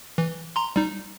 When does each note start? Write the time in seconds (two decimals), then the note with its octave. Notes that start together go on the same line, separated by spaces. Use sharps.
0.18 E3
0.56 A#5 C6
0.76 G3 D#4